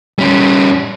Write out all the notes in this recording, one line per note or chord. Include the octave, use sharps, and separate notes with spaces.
G3 C#4